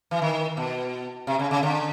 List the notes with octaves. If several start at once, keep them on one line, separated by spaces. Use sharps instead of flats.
E3
D#3
B2
C3
C#3
C#3
D3